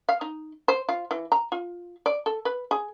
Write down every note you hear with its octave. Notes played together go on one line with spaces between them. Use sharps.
F5
D#4
C5
F4
E3
A#5
F4
D5
A4
B4
G#4